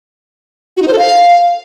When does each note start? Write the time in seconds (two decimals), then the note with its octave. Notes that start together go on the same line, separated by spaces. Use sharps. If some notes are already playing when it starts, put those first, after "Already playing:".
0.77 F#4
0.82 D#4
0.88 C5
0.93 A4
0.98 F5